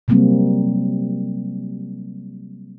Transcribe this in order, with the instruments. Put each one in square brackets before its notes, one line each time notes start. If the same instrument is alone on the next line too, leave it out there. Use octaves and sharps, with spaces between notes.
[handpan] C3 F#3 G3 A#3 C4